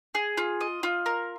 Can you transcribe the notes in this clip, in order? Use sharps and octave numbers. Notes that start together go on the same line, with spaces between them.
G#4
F4
D#5
F4
A#4